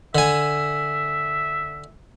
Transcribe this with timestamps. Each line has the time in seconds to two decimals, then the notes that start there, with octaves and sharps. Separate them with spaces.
0.15 D3 E5 G#5